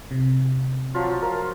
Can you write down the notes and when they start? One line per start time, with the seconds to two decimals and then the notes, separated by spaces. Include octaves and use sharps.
0.11 C3
0.94 F3 F#3 F4
1.22 A#4